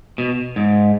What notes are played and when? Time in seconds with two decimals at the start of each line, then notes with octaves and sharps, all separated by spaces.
0.18 B2
0.56 G#2